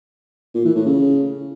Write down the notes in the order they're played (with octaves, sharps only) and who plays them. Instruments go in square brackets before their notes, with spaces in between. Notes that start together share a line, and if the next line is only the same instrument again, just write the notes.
[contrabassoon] A#2
E3
A2
C#3